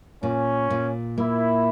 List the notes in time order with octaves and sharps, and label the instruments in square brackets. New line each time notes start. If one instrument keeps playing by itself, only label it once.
[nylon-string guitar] A#2 [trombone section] C#4
[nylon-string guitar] A#2
[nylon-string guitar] A#3 [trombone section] E4